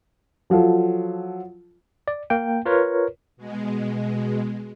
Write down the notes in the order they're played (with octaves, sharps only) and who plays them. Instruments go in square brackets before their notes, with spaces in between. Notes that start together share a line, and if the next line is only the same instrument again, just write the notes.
[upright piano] F3 F#3 F4 A4
[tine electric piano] D5
A#3 G5
F4 A#4 B4 C#5
[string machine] B2 G#3